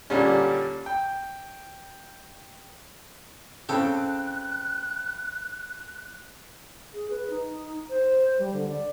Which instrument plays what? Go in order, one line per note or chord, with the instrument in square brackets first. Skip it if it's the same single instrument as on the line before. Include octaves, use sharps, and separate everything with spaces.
[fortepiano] A#2 D3 G3 C#4
G5
[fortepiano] C#3 C4 E6 [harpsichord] A4 G5 [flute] F#6
[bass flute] G#4
B4
D#4
C5
G3
D3
D5